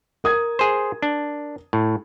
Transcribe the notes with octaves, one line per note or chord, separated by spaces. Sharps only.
A#4 D#6 G#6
G#4 C5
D4
A2